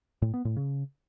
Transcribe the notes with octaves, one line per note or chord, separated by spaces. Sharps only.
A2
B3
A2
C#3